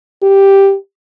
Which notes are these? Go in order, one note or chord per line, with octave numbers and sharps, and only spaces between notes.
G4